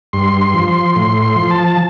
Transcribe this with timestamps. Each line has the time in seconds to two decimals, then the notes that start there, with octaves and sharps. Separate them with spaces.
0.13 G2 C6
0.41 C6
0.55 F3
0.68 C6
0.95 A2 C6
1.22 C6
1.36 F3
1.51 A5